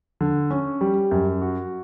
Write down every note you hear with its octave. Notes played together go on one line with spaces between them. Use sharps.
D3
C#4
G3
F#2
F#4